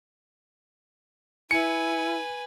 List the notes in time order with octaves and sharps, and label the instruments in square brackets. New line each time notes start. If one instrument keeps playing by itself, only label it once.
[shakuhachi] E4 [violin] B4 G#5 [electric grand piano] C#7